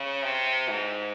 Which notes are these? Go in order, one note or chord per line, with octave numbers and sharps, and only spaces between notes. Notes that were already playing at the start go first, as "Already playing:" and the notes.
Already playing: C#3
C3
G#2